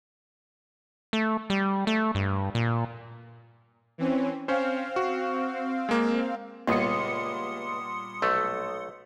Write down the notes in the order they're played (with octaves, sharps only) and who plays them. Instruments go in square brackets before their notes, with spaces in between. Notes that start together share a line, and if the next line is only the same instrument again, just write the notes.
[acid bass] A3
G3
A3
G2
A#2
[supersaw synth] E3 C4 C#4
[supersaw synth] C4 F5 [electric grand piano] C#4 C5
[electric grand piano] F#4
G#3 A#3
[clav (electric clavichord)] C#2 [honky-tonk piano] A#2 G3 B3 [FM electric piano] C6 D#6 C#7
[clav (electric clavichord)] B1 A3